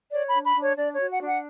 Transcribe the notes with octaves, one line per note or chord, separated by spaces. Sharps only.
C#5 D5
B5
D4
B5
D4
C#5
D4 D5
C#5
F#4
F#5
D4
F#5